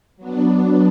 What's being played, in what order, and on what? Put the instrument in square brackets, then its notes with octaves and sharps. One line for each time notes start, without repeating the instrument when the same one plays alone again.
[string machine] F#3 B3 D4